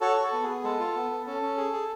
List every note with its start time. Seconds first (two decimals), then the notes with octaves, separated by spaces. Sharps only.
0.01 F#4 A4 C#5
0.17 F#4
0.23 A4
0.33 B3
0.43 G#4
0.49 B3
0.64 G#3 A4
0.80 F4
0.95 B3
1.11 B3
1.26 C#4 A4
1.42 C#4
1.57 G#4
1.73 G#4